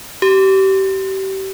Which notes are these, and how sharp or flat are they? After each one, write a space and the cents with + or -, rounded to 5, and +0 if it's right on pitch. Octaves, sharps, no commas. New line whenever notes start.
G4 -30